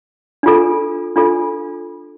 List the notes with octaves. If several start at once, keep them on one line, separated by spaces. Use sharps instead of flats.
D4 F4 A4
D4 F4 A4